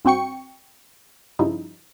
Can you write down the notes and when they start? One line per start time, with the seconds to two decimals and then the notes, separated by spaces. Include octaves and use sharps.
0.05 G2 C4 F#4 G5 C#6 C#7
1.39 G2 C#3 F3 G3 D#4 E4